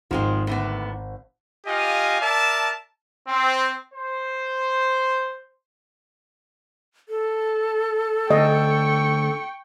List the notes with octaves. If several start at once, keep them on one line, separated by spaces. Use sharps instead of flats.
G#1 F3 G#3 C4
A2 D3 B3
F4 G4 D#5 F5 G#5
A#4 D5 E5 A5
C4
C5
A4
D2 D#5 G5 C#6